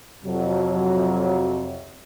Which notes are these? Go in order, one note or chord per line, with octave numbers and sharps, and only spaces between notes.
F2 C3 F#3